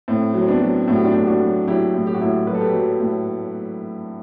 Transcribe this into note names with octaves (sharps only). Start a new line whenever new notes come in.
A2 C4
F#3
C4
B3 D4
F#3
A2 F#4
G4
D4 F#4
A2 G4
D4 F#4
F#3
F#3 E4 G4
A2
G4
F#4
A2 E4 G4
F#3 B4
A4
G4 B4
F#3
A2